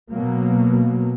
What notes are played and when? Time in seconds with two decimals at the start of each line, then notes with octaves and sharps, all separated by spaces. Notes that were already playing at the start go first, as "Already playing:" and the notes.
0.11 B2 F#3 A#3